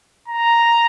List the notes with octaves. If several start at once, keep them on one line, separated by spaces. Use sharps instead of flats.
A#5